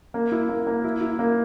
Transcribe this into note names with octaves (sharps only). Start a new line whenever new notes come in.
A#3
E4
A#3
A#3
E4
E4
A#3